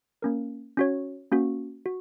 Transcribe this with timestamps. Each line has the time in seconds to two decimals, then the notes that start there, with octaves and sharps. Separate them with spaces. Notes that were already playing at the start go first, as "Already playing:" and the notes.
0.22 A#3 C#4 A#4
0.77 C#4 F#4 C#5
1.32 A#3 C#4 F#4
1.86 F#4